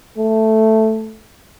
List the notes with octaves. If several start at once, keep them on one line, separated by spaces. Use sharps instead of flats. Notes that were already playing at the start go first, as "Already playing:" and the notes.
A3